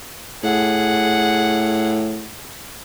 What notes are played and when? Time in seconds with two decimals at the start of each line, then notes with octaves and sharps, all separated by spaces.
0.43 A2 G#4 F#5